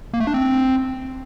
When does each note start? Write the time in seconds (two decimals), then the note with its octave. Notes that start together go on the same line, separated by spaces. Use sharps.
0.14 A#3
0.20 A3
0.27 D4
0.34 C4